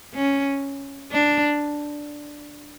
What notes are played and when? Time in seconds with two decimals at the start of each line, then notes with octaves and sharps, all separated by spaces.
0.15 C#4
1.12 D4